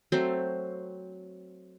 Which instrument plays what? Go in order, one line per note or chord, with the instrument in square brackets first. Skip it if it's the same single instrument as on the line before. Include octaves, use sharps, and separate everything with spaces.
[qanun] F#3 A3 C4 C5